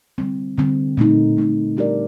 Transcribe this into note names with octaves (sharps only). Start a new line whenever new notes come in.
D3 G3 C4
D3 G3 C4
A#2 A3 C4 D#4
A#2 A3 C4 D#4
G3 D4 G4 A#4 D5